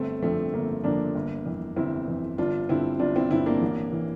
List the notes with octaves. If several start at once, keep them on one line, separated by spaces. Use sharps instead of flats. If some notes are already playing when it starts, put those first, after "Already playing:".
Already playing: G1 A3 C4
F2 D3 F3 A3 C4
G1 A#3
F2 D3 F3 A#3 D4
G1
F2 E3
G1 C4 E4
F2 E3
G1 D4 F4
G2 D3 C4 E4
G1 D4 F4
C4 E4
G2 D3 C4 E4
A#3 D4
A1
E3